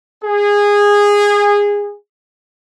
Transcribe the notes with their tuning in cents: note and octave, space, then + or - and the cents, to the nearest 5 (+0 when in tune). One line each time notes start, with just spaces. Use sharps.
G#4 -20